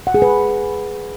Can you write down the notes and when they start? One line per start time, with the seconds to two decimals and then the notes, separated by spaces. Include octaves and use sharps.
0.07 F#5
0.14 G#4
0.22 B4